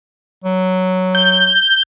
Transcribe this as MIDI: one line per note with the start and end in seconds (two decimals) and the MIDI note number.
0.44 1.57 54
1.15 1.83 91